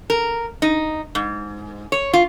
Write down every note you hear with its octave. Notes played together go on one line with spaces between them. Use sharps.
A#4
D#4
G#2
C#5
F4